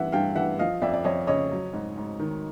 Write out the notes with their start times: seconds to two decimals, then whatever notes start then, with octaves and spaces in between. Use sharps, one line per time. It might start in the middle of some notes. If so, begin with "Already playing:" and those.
Already playing: G2 E3 E5 F#5
0.12 G2 F5 G5
0.35 E3 E5 F#5
0.59 F3 D#5 F5
0.82 F2 D5 E5
0.93 D5
1.04 F2 C#5 D#5
1.27 C#3 C#5 D#5
1.51 F#3
1.73 G#2
1.97 G#2
2.20 D#3